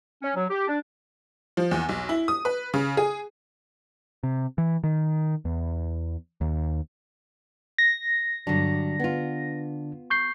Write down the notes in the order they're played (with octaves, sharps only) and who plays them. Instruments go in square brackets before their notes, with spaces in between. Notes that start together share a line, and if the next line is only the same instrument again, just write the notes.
[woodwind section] C#4
F#3
G4
D4
[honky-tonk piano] F3
E2
B1
E4
D#6
B4
C#3
G#4
[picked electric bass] C3
E3
D#3
E2
D#2
[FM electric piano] A#6
[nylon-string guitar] G2 F#3 [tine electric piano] D3 D4
[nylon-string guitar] B3 F4
[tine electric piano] C#6 G6 C7